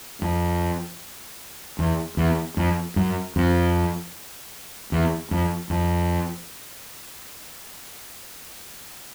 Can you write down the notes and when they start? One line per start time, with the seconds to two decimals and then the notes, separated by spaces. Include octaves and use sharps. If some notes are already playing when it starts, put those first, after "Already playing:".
0.22 F2
1.79 E2
2.17 E2
2.57 F2
2.96 F#2
3.36 F2
4.92 E2
5.31 F2
5.70 F2